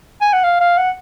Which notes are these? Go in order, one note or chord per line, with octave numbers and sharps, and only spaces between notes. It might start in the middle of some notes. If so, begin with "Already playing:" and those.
G#5
F#5
F5
F5
F#5